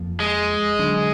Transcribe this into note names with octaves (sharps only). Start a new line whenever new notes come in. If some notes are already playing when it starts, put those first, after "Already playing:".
Already playing: F2 F3 A#3
G#3
D3 F#3 D4